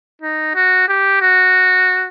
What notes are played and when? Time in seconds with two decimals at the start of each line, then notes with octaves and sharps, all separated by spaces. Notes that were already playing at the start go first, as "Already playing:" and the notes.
0.22 D#4
0.55 F#4
0.88 G4
1.21 F#4